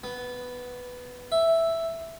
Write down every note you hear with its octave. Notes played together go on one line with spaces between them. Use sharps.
B3
E5